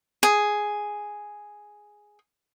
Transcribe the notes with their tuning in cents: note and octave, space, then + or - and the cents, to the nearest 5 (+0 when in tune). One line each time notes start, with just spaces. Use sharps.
G#4 +0